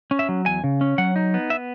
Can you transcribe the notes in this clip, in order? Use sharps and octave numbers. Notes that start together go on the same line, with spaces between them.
C#4
E5
F#3
E2 G#5
C#3
C#4
F#3 F#5
D#4
B3
E5